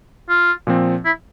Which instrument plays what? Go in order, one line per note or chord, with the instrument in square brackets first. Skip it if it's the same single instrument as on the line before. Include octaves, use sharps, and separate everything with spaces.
[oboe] F4
[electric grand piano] A#2 F3 C4
[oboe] E4